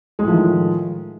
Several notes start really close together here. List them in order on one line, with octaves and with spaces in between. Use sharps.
G#3 A2 F3 D#3